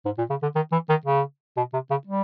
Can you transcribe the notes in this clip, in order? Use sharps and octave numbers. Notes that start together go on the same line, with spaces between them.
G#2
A#2
C#3
D3
D#3
E3
D#3
C#3
B2
C3
C#3
G3